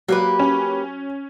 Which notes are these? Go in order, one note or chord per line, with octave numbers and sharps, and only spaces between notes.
F#3 A#3 G4 B4
C#4